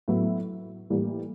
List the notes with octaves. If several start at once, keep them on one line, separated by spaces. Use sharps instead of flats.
A2 F#3 B3 E4
A2 E3 G3 A#3